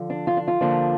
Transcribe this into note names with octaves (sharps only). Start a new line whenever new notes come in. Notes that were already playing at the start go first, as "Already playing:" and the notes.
Already playing: D3 F3
D4
F4
D4
F4
D3 F3 A#3 D4